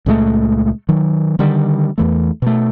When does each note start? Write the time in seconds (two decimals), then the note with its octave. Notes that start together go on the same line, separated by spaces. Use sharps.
0.06 C#2 A#2 G#3 A3
0.89 D#3 F#3
1.39 D3 D#3 G3
1.98 E2 E3 A3
2.42 B2 A3